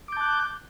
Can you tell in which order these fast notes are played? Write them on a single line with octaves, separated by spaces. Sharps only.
D6 G6 A5 F#6